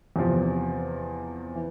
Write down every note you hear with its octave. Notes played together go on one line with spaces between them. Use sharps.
E2 C3 F3
E3